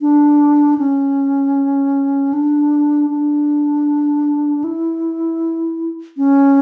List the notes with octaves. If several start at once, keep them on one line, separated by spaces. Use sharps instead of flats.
D4
C#4
D4
D4
E4
C#4